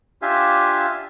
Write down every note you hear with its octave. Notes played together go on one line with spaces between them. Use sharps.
D4 F4 G4 E5 F5 G#5